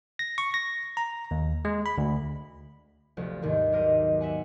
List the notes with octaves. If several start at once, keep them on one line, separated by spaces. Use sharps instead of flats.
A#6
C#6
A#6
A#5
D#2
G#3
B5
D2
G1 D2 C3 F3
D#2 G#2 C3 D#3
B1 A#4 D#5
E5 F#5 G#5